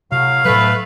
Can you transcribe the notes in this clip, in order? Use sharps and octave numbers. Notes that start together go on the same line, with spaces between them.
A2 C3 F#3 F5
D2 A2 F#3 A3 B4